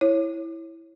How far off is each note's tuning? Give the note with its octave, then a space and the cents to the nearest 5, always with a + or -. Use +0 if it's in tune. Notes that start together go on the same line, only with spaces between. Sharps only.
E4 +0 C#5 -15